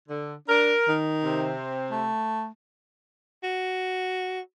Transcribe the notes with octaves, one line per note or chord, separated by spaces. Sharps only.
D3
D4 A#4
D#3
C3 C4
A3
F#4